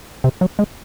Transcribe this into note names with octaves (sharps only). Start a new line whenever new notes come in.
C3
F#3
G#3